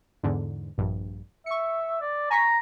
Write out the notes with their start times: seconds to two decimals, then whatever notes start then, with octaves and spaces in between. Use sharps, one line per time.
0.23 E2 G#2 D3
0.78 A#1 G2
1.46 E5 C#6 C#7
2.01 D5
2.31 G#5 A#5 C#6 B6